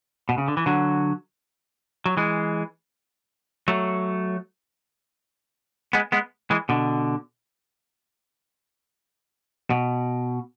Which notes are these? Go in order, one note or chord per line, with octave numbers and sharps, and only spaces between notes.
B2
C#3
D3
E3
D3 F#3
F#3
E3 G#3
F#3 A3
G#3 B3
G#3 B3
E3 G#3
B2 D3
B2